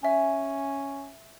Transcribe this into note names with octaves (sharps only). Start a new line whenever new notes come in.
C#4 E5 G#5